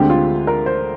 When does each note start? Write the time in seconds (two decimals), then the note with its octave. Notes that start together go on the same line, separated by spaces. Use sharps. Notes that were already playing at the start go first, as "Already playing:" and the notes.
Already playing: D2 D3 G#3 C4 G4
0.10 F4
0.47 A#4
0.66 C5